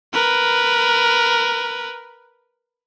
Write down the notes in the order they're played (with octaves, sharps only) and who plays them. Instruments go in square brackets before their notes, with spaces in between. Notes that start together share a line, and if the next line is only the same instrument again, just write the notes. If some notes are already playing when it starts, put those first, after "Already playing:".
[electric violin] A#4 B4